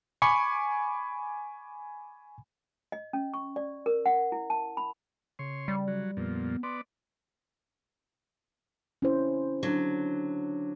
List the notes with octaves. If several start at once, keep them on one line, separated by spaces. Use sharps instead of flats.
G#5 B5 C#6 D6
D#5
C#4
C#6
D5
A#4
F#5
E4
A5
B5
C#3 C#5 C6
G3
F#3
F2 A#2 B3
B3 D5 C6
C#4 E4 C5
D3 F#3